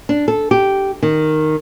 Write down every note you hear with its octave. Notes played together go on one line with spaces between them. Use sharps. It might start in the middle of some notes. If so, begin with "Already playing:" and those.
D4
A4
G4
D#3